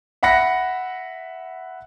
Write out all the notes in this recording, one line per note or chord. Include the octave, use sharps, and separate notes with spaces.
E5 F#5 B5 F#6 A#6 C#7